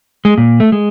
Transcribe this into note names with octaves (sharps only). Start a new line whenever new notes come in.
G#3
A#2
A3
G#3